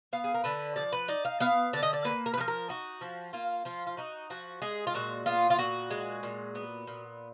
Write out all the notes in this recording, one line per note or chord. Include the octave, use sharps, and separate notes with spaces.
B3 F5
G#4
A#4
D3 B4
F3 D5
B4
D#4 D5
F5
B3 F5
D3 D5
D#5
D5
A#3 B4
A#4
B4
F3 A#4
A#4
D#4 F#4
F3
A#3 F4
F3 F4
F4
D#4 F#4
F3 F#4
G#3 G#4
F4
A#2 F#4
B3 F4
F4
A#2 F#4
G#3
A#2
B3
A#2